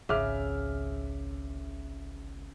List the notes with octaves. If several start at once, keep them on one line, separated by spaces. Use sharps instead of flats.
G#1 C#2 C#3 E5 D6 F6